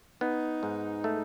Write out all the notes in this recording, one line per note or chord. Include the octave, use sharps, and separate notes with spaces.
B3 D#4
G#2
A3